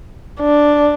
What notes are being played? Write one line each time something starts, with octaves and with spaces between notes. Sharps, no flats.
D4